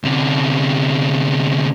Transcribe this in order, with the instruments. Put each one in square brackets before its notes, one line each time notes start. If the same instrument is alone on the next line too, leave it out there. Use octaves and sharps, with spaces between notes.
[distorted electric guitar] D2 C3